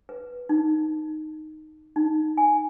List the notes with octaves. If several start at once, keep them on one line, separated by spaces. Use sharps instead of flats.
B4
D#4
D#4
G#5